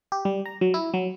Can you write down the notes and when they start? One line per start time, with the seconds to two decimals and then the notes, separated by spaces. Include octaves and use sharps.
0.12 G4
0.25 G3
0.46 A#5
0.61 F#3
0.74 E4
0.94 F#3